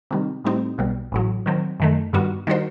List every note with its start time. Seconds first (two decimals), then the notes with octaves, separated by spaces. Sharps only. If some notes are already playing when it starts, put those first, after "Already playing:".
0.11 C3 D#3 G3
0.44 A2 G3 C4 D#4
0.78 B1 B2 G3
1.12 A1 A2 F#3
1.46 D#3 F#3 C4
1.80 F#2 D#3 A3
2.13 G2 D#3 G3 B3 F#4
2.47 D#3 G3 D#4 F#4 C5